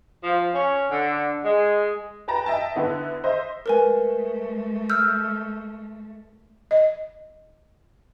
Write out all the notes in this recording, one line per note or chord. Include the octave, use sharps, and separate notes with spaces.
F3
C#4
D3
G#3
B4 G5 A5 A#5 A#6
D#5 E5 G5 A5
D3 B3 E4
C5 D#5 E5
G#3 A3 A#4 B4 G#5
E6 F6 G6
D#5